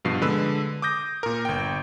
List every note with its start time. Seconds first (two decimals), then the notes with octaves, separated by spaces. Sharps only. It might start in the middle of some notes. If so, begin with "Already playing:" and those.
0.05 G2 B2 F3 C7
0.22 D3 G#3 B4 E6
0.82 D6 D#6 G6 A#6
1.23 A#2 A#4
1.45 G1 G5